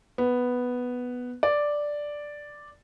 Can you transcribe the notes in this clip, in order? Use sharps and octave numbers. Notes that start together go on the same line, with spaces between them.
B3
D5